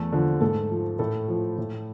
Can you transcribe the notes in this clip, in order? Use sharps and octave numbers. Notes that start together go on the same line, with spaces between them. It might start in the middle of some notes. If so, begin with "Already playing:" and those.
Already playing: E2 A3 A4
D3 F3
G#2 A3 A4
F3
A2 A3 A4
F3
A2